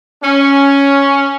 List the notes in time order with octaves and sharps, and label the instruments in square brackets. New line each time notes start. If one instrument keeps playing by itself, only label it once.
[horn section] C#4